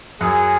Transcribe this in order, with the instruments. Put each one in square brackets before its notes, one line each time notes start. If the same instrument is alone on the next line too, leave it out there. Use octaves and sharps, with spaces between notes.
[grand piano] F#2 F#3 [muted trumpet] G#4